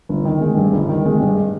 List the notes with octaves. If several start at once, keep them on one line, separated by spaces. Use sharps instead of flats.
G1
D#3
G#3
G2
G1
D#3
G#3
G2